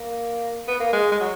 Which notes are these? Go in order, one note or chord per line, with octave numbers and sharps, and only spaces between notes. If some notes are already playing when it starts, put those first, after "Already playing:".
Already playing: A#3
B3
A#3
G#3
G#3
F#3